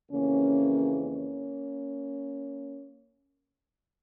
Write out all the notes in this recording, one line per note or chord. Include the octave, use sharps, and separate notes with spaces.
F2 C#3 E3 A#3 C#4
A#3 C#4